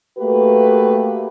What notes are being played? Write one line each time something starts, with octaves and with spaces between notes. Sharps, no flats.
A3 A#3 F#4 G4 B4